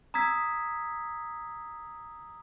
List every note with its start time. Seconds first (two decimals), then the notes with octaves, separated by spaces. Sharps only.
0.14 A#5 D#6 E6 G#6 B6